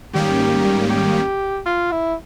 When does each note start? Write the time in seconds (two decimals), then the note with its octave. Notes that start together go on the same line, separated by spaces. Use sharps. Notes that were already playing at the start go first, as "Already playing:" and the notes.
0.13 G#2 D#3 G3 A#3 C#4 G4
0.90 G4
1.66 F4
1.92 E4